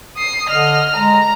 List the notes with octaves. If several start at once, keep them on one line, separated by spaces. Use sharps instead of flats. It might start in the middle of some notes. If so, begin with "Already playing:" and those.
D#6 C7
D3 D#5 F6
G#3 A#5